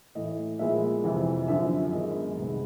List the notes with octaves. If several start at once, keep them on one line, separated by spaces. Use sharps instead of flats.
A2 E3 A3 D#5
A#2 F3 G#3 B3 E5
F2 C3 E3
F#2 D3 F3 E5
F#2 D#3 G#3 B3 D#5
C2 C3 D#3 G#3 B3